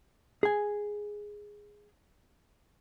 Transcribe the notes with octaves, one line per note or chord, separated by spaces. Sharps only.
G#4 G#5